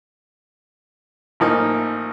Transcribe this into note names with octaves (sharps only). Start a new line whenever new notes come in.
A1 E3 F3 A#3 D#4